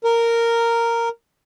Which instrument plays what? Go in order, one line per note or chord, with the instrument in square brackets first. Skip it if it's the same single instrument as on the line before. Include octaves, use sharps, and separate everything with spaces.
[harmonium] A#4